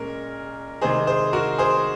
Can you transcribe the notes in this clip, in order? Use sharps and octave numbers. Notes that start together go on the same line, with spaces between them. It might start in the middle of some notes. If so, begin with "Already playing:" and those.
Already playing: A#2 G#3 C#4 A#4
C3 D#3 G#3 D#4 G#4 C5
G#4 C5
F#4 A#4
G#4 C5